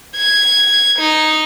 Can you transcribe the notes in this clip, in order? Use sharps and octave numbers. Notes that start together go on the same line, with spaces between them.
G#6
D#4